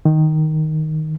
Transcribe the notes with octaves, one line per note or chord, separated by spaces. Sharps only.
D#3